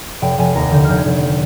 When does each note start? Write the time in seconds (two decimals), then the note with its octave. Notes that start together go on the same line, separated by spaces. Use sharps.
0.22 F1 G5
0.38 F1 G#5
0.55 D#2 A#5
0.72 D3 G6
0.85 F1 F6 G6
0.98 G#6
1.05 F1 G6